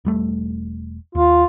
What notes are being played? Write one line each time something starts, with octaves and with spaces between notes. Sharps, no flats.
E1 G3 A3
D#2 F4